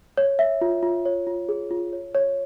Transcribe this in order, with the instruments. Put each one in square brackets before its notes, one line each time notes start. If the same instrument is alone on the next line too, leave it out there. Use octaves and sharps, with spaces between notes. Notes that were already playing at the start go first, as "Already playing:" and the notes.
[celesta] C#5
E5
F4
F4
C#5
F4
G#4
F4
C#5
C#5